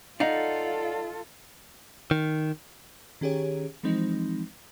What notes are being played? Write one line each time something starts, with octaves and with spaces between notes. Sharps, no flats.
D#4 F4 A4 D5 F5 F#5
D#3
D#3 C#4 G4 G#4 C#5
E3 F3 G#3 C4 D#4